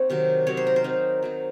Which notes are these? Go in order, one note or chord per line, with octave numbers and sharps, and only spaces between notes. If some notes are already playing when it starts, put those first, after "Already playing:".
Already playing: A#3 C4 D#4 C#5 F#5
C3 D#3 F#3
C3 D#3 F#3 C#5
C5
A#4
C5
F#3 C4 D#4
F#3 C4 D#4